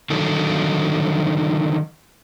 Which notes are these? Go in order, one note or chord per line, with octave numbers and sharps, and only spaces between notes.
D3 D#3 F#3 G3 D#4 A4